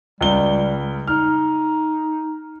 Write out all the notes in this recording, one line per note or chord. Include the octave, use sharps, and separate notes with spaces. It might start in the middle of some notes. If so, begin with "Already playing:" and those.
C#2 G3 G7
D#4 F6